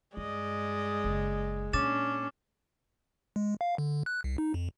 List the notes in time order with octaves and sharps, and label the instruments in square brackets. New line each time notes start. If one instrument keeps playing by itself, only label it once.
[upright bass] G2 [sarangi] G#3 [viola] D5 D#5
[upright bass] F#1
[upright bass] A#2 [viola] C#4 D4 [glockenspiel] D6 A6 E7
[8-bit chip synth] G#3
F5
D3
F#6
C2
D#4
F2